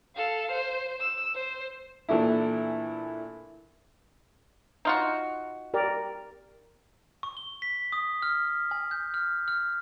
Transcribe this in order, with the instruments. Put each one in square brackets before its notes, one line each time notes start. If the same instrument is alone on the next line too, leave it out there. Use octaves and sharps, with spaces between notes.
[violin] A4 F5
C5
E6
C5
[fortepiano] A#2 E3 A3 D4 E4
[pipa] D#4 F4 F#4
[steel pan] G4 A#4 D5
[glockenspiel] C#6
G7
B6
D#6
F6
G#5
G6
F6
F6